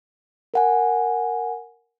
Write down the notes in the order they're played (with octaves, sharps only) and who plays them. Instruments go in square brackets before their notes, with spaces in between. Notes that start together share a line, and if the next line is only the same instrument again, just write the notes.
[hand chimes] A#4 F#5 G#5